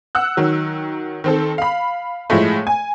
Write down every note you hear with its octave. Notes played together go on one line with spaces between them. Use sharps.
F#5 E6 F#6
D#3 F#3
D#3 C4 A4
F5 B5
A2 F3 G#3 A3
G#5